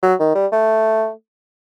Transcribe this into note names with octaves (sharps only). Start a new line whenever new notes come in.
F#3
D#3
G3
A3